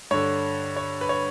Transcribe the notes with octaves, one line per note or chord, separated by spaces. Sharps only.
G2 D3 C#5
C#5
B4
C#5